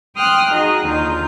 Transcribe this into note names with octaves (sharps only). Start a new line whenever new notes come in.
G5 C6 D#6 F6 F#6
D#4 F#4 G#4 D#5
D#2 D3 D#4 F4 G6